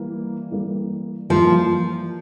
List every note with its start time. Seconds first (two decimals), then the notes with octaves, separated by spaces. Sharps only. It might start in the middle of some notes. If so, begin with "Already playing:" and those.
Already playing: E3 G3 A#3
0.51 E3 G3 A#3
1.30 E3 F3 G3 A#3